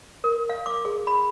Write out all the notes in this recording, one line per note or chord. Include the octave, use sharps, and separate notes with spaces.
A#4
F5
D6
G#4
B5